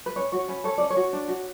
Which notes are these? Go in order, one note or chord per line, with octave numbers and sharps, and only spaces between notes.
B4
C#4 C#5
F#4 C#5
C#4 B4
A4 C#5
C#4 D5
C#5
F#4
D4
F#4